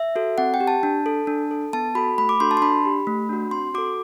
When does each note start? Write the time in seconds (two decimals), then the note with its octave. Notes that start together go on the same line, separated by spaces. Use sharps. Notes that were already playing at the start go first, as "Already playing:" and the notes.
Already playing: E5
0.16 F#4 A4
0.38 C4 F#5
0.54 G5
0.60 G4
0.67 A5
0.83 D4
1.06 A4
1.27 D4
1.51 A4
1.73 B3 A5
1.95 F#4 A4 B5
2.18 A3 B5
2.29 D6
2.40 D4 F#4 A4 C6
2.51 A5
2.57 C6
2.62 D4 B5
2.85 G4
3.07 A3
3.29 D4 F#4
3.51 C4 C6
3.74 F#4 A4 D6